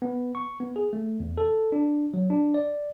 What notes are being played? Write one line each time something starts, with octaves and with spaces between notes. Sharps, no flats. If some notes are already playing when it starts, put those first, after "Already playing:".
B3
C#6
B3
G#4
A3
E2
A4
D4
F#3
D4
D5